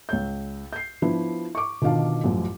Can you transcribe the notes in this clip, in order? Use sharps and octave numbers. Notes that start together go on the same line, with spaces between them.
C#2 C#5 G6
G6 C7
F3 B3 D4 E4
C#6 D6
B2 D3 D#3 F4 F5 A5
A1 F#2 F3